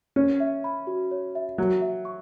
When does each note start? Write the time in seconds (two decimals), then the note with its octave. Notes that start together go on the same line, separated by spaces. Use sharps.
0.16 C#4 C#5
0.40 E5
0.64 B5
0.87 F#4
1.11 C#5
1.35 E5
1.58 F#3 C#5
1.82 E5
2.05 C#6